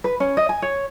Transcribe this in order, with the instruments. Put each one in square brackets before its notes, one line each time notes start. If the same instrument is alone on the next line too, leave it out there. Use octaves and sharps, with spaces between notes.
[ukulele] B4
C#4
D#5
G#5
C#5